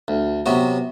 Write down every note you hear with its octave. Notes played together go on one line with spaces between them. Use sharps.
D2
C3 F#3 B3 F#4